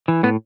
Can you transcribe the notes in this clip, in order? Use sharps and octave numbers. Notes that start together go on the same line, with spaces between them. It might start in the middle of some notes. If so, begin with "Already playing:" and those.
E3
A2 B3